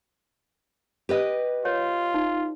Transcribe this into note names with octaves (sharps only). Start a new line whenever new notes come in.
G4 B4 D#5
F4 C#5
D#4